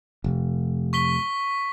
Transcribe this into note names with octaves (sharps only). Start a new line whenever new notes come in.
F1
C#6 B6 G7